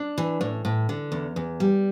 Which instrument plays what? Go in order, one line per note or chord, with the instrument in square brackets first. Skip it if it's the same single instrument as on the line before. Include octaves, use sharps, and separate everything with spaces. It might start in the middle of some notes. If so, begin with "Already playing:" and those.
Already playing: [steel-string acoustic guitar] D4
E3
A2
A2
D3
E2
E2
G3